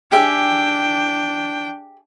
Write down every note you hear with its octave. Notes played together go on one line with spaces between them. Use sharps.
D4 G4 G#4 E5 G5